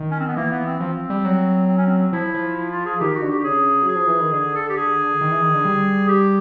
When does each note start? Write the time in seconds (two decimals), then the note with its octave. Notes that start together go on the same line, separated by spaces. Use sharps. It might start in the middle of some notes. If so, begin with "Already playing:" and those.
Already playing: D#3
0.11 C#4
0.19 C4
0.27 B3
0.36 E3 A#3
0.51 B3
0.66 C4
0.80 F3 C4
1.10 G3
1.24 F#3
1.68 C4
1.78 C#4
1.86 C4
2.12 F3 E4
2.34 F3
2.56 E4
2.71 F4
2.86 G#4
3.00 D#3 G4
3.15 F#4
3.22 D3
3.30 G4
3.40 G4
3.44 C#3 G#4
3.83 F#3
3.88 G#4
3.95 F3
4.07 E3
4.21 D#3
4.33 D3 G#4
4.55 A4
4.69 G4
4.76 G#4
5.21 D#3
5.31 E3
5.42 D#3
5.54 D3
5.65 G3
6.08 G4